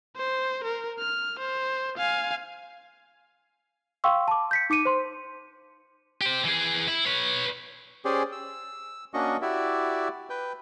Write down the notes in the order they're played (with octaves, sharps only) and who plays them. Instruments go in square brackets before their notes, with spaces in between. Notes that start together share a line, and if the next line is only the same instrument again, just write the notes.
[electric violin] C5
A#4
F6
C5
F5 G#5
[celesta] F5 G5 C6 C#6 E6
A5 D6
G6 B6 C#7
D#4 D6 C#7 D#7
C5 C6
[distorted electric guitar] G4 C5
E3 G#4
E4
B4 C#5
[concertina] C#4 G4 G#4 C5 D5
E6
A#3 C#4 D4 F#4 D#5 C#6
E4 F#4 G4 D5 E5
B4 G5